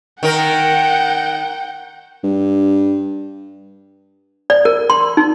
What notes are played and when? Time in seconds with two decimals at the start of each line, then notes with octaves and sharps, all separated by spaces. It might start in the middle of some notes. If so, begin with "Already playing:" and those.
0.23 D#3 A#4 F#5 G5
2.24 G2
4.50 D5
4.65 A#4
4.90 C6
5.17 D#4